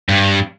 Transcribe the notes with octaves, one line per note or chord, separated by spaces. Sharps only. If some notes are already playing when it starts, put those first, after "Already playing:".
G2